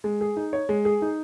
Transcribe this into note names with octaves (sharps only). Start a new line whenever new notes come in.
G#3
G#4
D#4
C#5
G#3
G#4
D#4